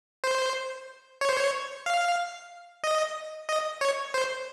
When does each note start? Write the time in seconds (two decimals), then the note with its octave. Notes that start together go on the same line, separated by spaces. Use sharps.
0.24 C5
1.21 C#5
1.29 C5
1.36 C#5
1.86 F5
2.84 D#5
3.49 D#5
3.81 C#5
4.14 C5